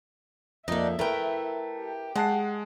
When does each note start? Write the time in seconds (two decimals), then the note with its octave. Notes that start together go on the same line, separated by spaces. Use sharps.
0.68 F2 A#3 D4 D#4 E5
0.99 A3 E4 A#4 B4 G5
1.78 G4
2.15 G#3 F#5 A5 C7